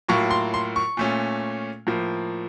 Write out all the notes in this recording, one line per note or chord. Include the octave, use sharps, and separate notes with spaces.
A2 F#3 A#3 F4 C#6
C6
C6
C#6
A#2 A3 C#4 F4
A2 F3 A#3